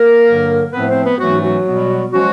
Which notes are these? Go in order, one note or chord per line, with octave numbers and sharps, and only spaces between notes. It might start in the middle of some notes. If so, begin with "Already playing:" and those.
Already playing: A#3 A#4
G2 D3 F#3
A2 F3 A3 B3 C4 B4
C4 C5
B3 B4
G#2 E3 F#3 A3 C#4 F#4
F#3 F#4
B2 G3 B3
F3 F#3 G#3 C#4 F#4